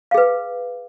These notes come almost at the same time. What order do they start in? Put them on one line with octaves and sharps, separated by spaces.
F5 G#4 B4